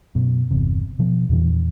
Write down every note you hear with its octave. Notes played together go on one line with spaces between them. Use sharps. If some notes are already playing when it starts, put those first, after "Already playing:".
F#2 B2
G1 E2 C3
B2 F3 B3
E2 A#2 E3